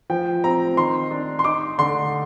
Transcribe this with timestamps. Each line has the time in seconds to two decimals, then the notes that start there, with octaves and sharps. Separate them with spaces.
0.10 F3 G5
0.44 C4 A#5
0.77 D#3 C6
1.11 D4
1.39 C6
1.44 D#4 D6
1.79 D3 C6